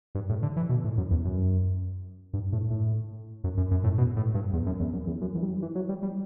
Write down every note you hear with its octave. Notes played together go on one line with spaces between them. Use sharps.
G2
A2
D3
E3
B2
A2
F#2
E2
F#2
G2
A2
A2
F#2
F#2
F#2
A2
B2
A2
G2
E2
F#2
E2
F#2
E2
F#2
E2
G2
F#2
E3
F#3
G3
G3